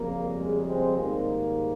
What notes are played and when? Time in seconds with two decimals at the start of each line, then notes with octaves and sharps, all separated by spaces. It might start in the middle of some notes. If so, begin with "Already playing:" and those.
Already playing: F2 C#3 G3 A#3
0.38 G#3
0.67 G#3 C4
0.97 G#2 D#3 G3 A#3